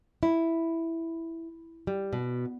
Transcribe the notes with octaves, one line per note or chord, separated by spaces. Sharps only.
E4
G3
B2